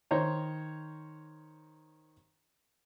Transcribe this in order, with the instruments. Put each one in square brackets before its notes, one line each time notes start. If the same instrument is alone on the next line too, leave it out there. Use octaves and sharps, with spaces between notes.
[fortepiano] D#3 C5 C#5 A#5